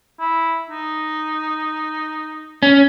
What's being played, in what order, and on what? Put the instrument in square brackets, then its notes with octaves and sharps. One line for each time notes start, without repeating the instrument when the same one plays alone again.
[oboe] E4
D#4
[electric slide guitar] C#4